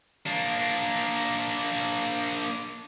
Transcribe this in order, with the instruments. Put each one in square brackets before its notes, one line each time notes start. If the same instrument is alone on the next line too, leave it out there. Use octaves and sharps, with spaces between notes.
[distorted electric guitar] A#3 D4